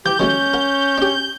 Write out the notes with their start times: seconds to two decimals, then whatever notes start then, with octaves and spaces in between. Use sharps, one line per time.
0.06 E3 G4 G6
0.19 D#3 F#3 A3 C#4
0.54 A#4 F#5
0.98 D4 G4